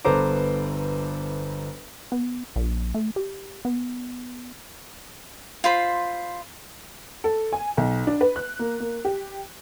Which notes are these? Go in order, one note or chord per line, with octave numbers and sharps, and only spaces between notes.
G1 B3 A4 C5 A#5 D6
B3
A#1
A3
G4
B3
F4 C5 B5
A4
G#5
B1
D4
B4
F#6
A#3
A#3
G4